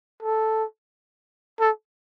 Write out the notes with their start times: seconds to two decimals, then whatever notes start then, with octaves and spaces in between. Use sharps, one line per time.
0.23 A4
1.60 A4